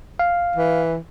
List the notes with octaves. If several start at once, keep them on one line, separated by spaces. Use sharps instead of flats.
F5
E3